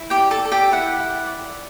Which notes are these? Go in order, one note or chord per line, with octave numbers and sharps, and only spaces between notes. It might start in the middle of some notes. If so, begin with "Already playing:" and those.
Already playing: E4
G4 G5
D5
A4 A5
A4
G4 G5
E4 F#5
E4
D5